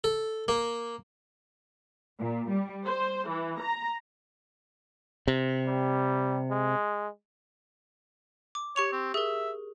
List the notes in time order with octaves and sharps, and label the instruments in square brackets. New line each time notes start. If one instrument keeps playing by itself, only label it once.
[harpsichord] A4
A#3
[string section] A#2
G3
C5
E3
A#5
[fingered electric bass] C3
[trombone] G3
G#3
[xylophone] D6
[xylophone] G4 C#6 F7 [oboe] C#5
[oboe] C4
[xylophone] G#4 A#4 [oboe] E5